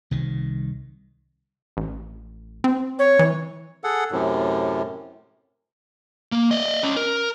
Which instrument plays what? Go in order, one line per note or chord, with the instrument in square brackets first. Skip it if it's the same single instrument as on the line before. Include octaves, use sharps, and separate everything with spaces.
[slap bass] C2 D#3
[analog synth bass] A1
C4
[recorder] C#5
[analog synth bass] E3
[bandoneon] G#4 A4 F#5
F#2 A2 C3
[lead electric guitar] A#3
D5 D#5
C#4 D#5
A#4